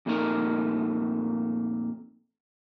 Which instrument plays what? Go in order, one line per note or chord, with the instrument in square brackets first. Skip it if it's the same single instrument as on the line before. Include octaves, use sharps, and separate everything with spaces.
[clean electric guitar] F2 A#2 A3 D#4 E4 A#4